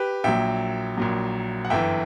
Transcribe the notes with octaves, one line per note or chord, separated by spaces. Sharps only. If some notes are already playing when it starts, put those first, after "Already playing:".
Already playing: G4 B4
A#1 A#2 F#3 E5 G5
A#1 A#2 F#3
F#5
G1 F#2 E3 E5 G5